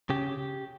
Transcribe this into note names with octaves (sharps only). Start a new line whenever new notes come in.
C#3 G4